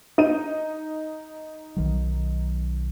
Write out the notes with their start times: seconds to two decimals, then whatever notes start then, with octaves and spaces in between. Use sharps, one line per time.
0.18 D#4 D#7
1.76 B1 D#3 F#3